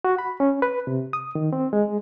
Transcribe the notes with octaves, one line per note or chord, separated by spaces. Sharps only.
F#4
B5
C#4
B4
C3
D#6
D#3
C4
G#3